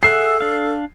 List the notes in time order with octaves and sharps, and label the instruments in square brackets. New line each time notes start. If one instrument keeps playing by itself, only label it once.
[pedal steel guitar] G#4 E5 F#5 [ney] A4 [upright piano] C7
[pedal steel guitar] D4 F5